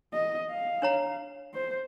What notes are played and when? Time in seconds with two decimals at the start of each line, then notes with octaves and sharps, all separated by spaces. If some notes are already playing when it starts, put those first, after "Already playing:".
0.13 D#5
0.51 F5
0.82 D4 C#5 A#5
1.54 C5